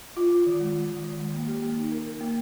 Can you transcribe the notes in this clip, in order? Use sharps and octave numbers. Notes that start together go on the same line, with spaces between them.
F4
F4
D#3
G#3
G#3
D#3
D#3
G#3
A#3
G4
A#3
D#4
A#4
A#4
A#3